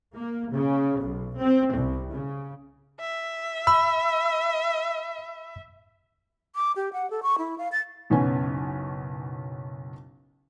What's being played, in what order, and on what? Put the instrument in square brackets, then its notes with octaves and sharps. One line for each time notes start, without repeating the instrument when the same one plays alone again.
[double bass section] A#3
C#3
B1
C4
C2
C#3
[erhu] E5
[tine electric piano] B5 [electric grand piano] E6
[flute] D6
G4
F#5
A4
C#6
E4
F5
A6
[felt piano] F#1 B1 B3 C#4 G#5